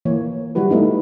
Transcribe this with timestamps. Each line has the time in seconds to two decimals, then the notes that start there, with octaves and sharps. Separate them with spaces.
0.05 E3 A#3 C#5
0.55 E3 F#3 G3 E4 F#4 B4
0.70 A3 B3 D#4 E4